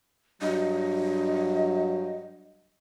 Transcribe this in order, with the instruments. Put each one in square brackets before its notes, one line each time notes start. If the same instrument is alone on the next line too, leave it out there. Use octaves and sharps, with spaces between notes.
[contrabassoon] G2 [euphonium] F#3 [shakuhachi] D#5